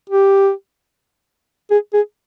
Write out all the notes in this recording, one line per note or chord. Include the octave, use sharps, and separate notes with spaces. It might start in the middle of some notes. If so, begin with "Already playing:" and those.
G4
G#4
G#4